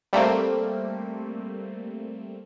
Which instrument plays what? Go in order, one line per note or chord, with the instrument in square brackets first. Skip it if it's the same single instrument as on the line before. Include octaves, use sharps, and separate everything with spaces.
[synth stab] G3 A3 A#3 C4